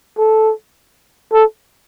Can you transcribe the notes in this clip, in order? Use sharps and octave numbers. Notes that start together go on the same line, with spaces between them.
A4
A4